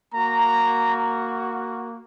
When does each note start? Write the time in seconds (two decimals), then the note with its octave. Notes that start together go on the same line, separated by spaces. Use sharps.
0.14 A#3 F#4 A#5